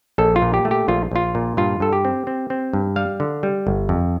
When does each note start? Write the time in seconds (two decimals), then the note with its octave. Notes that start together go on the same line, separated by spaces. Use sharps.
0.18 A#1 A4
0.36 F4
0.42 A#2
0.54 G4
0.65 A3
0.71 G4
0.88 A#1 F4
1.11 A#1 F4
1.35 A#2
1.57 G2 F4
1.80 G2 A4
1.93 G4
2.05 C4
2.27 C4
2.50 C4
2.73 G2
2.96 G3 F5
3.20 D3
3.43 G3
3.67 G1
3.89 F2